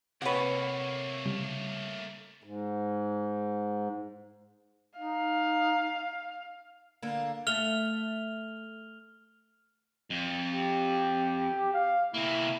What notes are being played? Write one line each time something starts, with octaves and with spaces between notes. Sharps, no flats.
C3 A3 A#3 B4 C#5 F#5
C#3 G3 C#4
G#2
D#4 F5
D3 A#3
A3 F6 F7 G7
F2
G4
F5
C3 A#3 E4